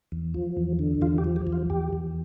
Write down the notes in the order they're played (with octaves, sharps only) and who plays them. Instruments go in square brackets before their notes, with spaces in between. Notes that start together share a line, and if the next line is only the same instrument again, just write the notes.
[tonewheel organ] E2
F3
E2
D3
E2 F4
G4
F3
G4
E2
F4
E2 G4
E2